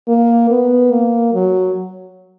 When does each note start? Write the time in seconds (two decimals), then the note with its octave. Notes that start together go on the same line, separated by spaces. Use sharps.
0.08 A#3
0.50 B3
0.92 A#3
1.34 F#3